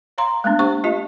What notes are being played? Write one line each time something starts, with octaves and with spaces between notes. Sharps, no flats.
C#5 F5 A#5 C6
G#3 A3 B3 D4
A#3 D4 G4 C5 C#6
A3 F4 G4 D#5 A5